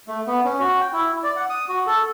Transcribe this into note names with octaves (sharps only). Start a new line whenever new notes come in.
A3
B3
C#4
F#4
G5
E4
D5
F#5
D#6
F#4
A4